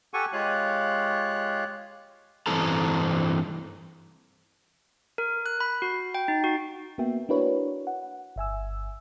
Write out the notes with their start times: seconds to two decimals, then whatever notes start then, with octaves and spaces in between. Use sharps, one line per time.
0.14 G4 A4 F#5 G#5 C#6
0.33 G#3 F4 G4 C#5 F5 F#6
2.46 G2 E3 C4 A4 A#5
5.18 A#4
5.46 F#6
5.60 B5
5.82 F#4
6.15 G5
6.28 D#4
6.44 F#4
6.98 A#3 B3 F#4 E5 G5
7.29 D4 E4 F#4 A#4 B4 C#5
7.87 F#5
8.36 G1 E5 G#5 E6